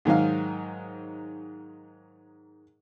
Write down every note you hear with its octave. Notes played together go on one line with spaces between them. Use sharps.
G#2 D#3 F#3 F5